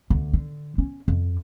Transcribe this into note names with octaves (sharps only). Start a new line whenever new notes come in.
D2
D3
C#4
F2